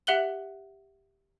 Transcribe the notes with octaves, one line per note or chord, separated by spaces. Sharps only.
G4 E5 F#5 F#6 F#7 G7